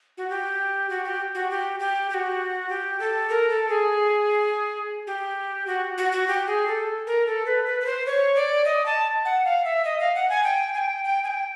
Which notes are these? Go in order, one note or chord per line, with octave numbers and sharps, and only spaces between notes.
F#4
G4
F#4
G4
F#4
G4
G4
G4
F#4
G4
A4
A#4
A4
G#4
G4
F#4
F#4
F#4
G4
G#4
A4
A#4
A4
B4
B4
B4
C5
C#5
D5
D#5
A5
F#5
F5
E5
D#5
F5
F#5
G#5
G5
G#5
G5
G5
G#5
G5